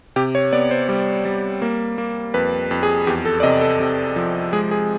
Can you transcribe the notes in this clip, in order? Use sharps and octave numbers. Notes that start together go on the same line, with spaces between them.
C3 G4
C#5
B3 D5
C5
G3
G3
A#3
A#3
F2 B4
F2
G#4
E2 G4
A4
D5
C3 D#5
A4
C3
F3
G#3 G#4
G#4